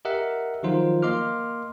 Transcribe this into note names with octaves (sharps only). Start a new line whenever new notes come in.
G4 A#4 D#5 E5 F#5
D#3 F3 F#3 D#4 F4 C5
A#3 D#5 C6 D6 F6